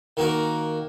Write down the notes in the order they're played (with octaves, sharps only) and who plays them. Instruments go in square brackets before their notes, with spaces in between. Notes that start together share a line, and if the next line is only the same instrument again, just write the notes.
[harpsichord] D#3 A#3 F#4 A#4